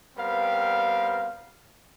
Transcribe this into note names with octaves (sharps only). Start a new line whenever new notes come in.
G3 B3 C4 A#4 F5